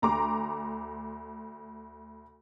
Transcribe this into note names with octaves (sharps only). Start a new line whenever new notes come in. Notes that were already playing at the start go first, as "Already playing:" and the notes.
D2 A#5 C6 D6